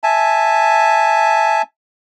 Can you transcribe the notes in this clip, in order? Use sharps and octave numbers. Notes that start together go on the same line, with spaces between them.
E5 G#5 A5